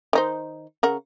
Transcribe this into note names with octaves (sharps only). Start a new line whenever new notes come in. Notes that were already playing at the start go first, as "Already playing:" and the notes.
D#3 D#4 C5
C#3 A#4 F#5